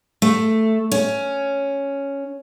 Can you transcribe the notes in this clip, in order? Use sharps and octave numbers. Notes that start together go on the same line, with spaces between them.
A3
C#4